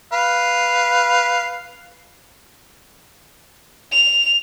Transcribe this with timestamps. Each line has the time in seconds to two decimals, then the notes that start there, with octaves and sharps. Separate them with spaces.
0.13 B4 F5
3.92 F7